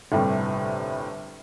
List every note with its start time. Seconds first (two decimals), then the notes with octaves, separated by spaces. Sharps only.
0.12 G1 A2 C3 G3